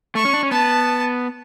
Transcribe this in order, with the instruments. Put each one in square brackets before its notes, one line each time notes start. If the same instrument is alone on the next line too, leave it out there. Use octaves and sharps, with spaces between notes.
[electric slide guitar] A3 [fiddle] C#6
[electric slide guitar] C#4
D4
C#4
[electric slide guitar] B3 [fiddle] A5